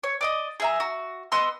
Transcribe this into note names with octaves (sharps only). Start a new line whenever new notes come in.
C#5
D5 D#5 D#6
G#4 E5 A#5
F#4
B3 D#5 C6 E6